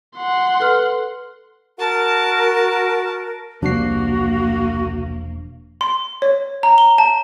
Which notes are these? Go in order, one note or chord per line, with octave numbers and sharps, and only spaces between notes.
F#5 C6
A4 B4 F6
F#4 A#4 A5
E1 C2 C3 F3 A#3 D4 F#4 C7
C6
C#5
A#5
G7
A5